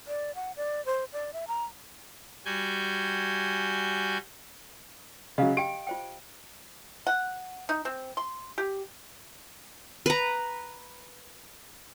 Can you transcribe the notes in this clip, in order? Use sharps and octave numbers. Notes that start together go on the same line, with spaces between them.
D5
F#5
D5
C5
D5
E5
A#5
G3 F#4 G#5 G6
C#3 F#3 D#5 F5
G4 G5 D7
F4 C5 G5
F#5
D#4
C4
C6
G4
B4 A#5